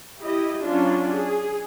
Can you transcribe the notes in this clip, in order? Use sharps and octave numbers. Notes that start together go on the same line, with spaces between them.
E4 G4 D#5
F#3 C#4 D4 F4
G#4